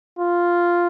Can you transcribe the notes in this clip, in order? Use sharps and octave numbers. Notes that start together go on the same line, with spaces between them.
F4